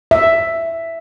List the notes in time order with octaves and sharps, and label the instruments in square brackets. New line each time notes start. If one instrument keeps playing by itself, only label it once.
[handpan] E5